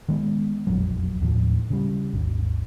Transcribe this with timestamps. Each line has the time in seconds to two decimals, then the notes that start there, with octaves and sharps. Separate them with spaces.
0.08 D#3 G#3 B3
0.67 E1 A#1 F2 F#3
1.22 D#2 A2 F3
1.70 C#3 G3
2.13 G#1 D#2